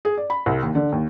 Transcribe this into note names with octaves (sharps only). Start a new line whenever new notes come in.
G#4
D5
B5
C2
D#2
D3
D#2